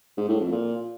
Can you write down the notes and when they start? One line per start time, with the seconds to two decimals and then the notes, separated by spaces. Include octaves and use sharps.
0.17 G#2
0.29 A2
0.40 F2
0.52 A#2